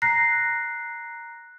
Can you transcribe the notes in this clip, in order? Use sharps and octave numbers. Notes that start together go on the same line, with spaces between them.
A#5 F#6 A#6 C7